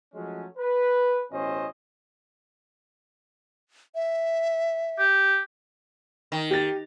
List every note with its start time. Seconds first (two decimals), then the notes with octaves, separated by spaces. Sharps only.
0.14 F3 F#3 G#3 A3 C#4
0.58 B4
1.32 A1 B2 C#4 E4 C5 D#5
3.95 E5
4.99 G4
6.32 D#3
6.51 G4 A6